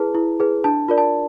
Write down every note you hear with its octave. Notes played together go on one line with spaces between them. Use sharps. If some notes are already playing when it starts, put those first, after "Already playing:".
Already playing: E4 G#4 B4 A5
E4
G#4 B4
D4 A5
F4 A#4 D5
A5